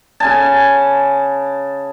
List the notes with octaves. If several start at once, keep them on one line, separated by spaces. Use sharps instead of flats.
C#3 G#5 A5